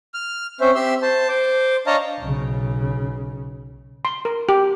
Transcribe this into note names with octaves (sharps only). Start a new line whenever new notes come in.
F6
C4 C#4 C5 E5
C4 G4 E5 C6 E6
C5 A5
C5 D6
D4 C#5 D#5 F5 A5 A#5
B1 C#3
C6
A#4
G4